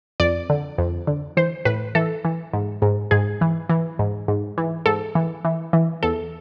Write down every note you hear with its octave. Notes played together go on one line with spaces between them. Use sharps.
F2 D5
D3
F2
D3
E3 C5
A2 B4
E3 A4
E3
G#2
G#2
G#2 G#4
E3
E3
G#2
G#2
E3
G#2 A4
E3
E3
E3
E2 A4